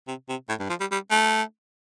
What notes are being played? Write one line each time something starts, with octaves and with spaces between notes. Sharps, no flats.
C3
C3
A2
G2
F3
G3
G3
A3